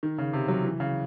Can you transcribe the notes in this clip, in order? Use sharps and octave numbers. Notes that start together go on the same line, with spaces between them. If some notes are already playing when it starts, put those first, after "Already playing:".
D#3
C#3
C3
F#3
E3
C#3